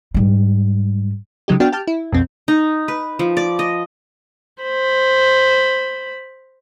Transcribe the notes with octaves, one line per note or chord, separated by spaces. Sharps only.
G#2 G3
C#3 F#3 G#3 D#4 G4
B3 D4 F#4 G5 F6 A6
G4 G5 A5 F6
E4
B1 F2 C4
D#4
B4
F3
D5
D#5
C5 B5